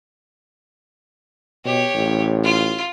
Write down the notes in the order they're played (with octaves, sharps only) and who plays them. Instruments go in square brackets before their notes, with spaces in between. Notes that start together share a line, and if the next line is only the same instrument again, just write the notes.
[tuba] B2 [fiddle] G4 C#5
[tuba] A1
[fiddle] F4